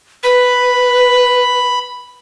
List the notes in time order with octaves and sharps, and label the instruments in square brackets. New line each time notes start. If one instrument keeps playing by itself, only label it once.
[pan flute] B4 [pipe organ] B5